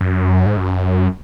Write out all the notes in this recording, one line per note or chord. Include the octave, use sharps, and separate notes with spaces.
F#2
G#2
F#2